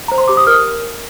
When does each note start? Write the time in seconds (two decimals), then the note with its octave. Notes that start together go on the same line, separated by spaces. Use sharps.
0.08 C5 A#5
0.18 C6
0.28 G4 D6
0.37 D#6
0.47 A#4 F6